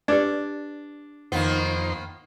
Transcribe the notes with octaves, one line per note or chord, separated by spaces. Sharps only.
D4 G4 B4 D5
F2 D#3 A#3 B3 D#4 C5